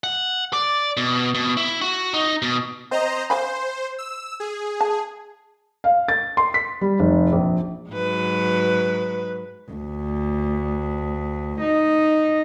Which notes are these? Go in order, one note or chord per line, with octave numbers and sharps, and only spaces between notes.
F#5
D5
B2
B2
E4
F#4
D#4
B2
C4 C5 D#5 A#5
C5 F5 G#5 B5
E6
G#4
A5
F5
A6
C6
B6
G3
F1
A#1
G#2 F#3 B4
D2
D#4